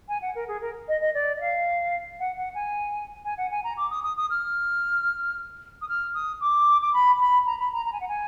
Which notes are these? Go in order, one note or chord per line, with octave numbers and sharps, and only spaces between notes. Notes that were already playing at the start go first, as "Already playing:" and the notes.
G#5
F#5
A#4
G#4
A#4
D#5
D#5
D5
D#5
F5
F#5
F#5
G#5
G#5
F#5
G#5
A#5
D6
D#6
D#6
D#6
F6
D#6
F6
D#6
D6
D6
B5
B5
A#5
B5
A#5
A#5
G#5
F#5
G#5